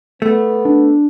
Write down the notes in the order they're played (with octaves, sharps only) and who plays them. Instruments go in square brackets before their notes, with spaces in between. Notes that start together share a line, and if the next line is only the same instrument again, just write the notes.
[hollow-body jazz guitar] A3 [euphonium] B3
[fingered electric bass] D4